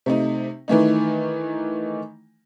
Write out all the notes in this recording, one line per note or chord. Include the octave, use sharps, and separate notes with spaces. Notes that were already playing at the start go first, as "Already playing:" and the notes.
C3 A3 D#4
D#3 E3 A3 D#4